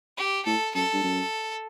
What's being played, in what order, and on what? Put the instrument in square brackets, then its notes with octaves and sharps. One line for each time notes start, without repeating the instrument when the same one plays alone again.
[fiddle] G4
[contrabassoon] A2 [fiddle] A4
[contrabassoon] F#2 [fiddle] A4
[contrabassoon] G2
F#2